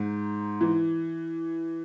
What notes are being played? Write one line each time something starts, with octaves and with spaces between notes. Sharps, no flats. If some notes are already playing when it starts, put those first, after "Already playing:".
Already playing: G#2
E3